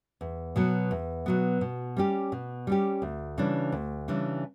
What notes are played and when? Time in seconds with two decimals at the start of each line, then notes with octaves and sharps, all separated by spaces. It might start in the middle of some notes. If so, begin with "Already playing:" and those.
0.21 E2
0.56 B2 F#3 B3
0.91 E2
1.26 B2 F#3 B3
1.61 B2
1.97 G3 C#4 G4
2.32 B2
2.67 G3 C#4 G4
3.02 D2
3.38 C#3 E3 G3 D4
3.72 D2
4.08 C#3 E3 G3 D4